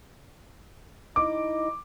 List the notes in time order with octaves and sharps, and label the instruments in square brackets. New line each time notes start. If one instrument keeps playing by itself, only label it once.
[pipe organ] D#4 E4 D#5 [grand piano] D6